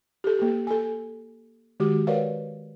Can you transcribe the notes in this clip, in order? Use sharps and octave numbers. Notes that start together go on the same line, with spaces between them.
G4 A4
A#3 G4
A4 G#5
D#3 G#3 F#4 G4 D6
A#4 B4 C#5 D5 F5 F#5